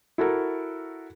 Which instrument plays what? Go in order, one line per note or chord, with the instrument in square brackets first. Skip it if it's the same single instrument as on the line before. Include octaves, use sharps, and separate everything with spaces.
[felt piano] E4 F#4 A4 A#4